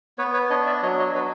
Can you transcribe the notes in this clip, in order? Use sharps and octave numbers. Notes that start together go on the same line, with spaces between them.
B3 B4 C#5
B4 C#5
D4 C#5 D#5
D5 E5
F#3 C#5 D#5
C#5 D#5
F#3 B4 C#5